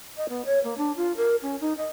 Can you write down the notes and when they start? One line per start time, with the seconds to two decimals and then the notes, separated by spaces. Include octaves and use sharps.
0.16 D#5
0.28 B3
0.45 C#5
0.63 A#3
0.77 D4
0.96 F4
1.16 A#4
1.41 C#4
1.60 D#4
1.77 D#5